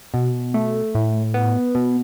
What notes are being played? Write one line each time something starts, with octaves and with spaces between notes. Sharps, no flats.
B2
A3
A2
B3
B2